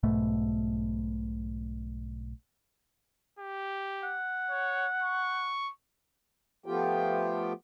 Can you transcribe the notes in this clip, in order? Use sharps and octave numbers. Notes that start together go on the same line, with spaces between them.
B1 G#2 B2 A3
G4
F#5
C#5
C#6
F3 A3 B3 F4 G4 G5